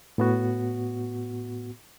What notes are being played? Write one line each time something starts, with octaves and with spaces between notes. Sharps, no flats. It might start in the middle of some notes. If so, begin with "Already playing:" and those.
A2 B3 F#4